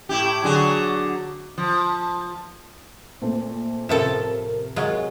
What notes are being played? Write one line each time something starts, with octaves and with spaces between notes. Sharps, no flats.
A2 E4 G4
D3 F#3 G#4
F3
A#2 A3 C4
A2 C3 F3 A4 A#4 E7
F#3 G#3 F4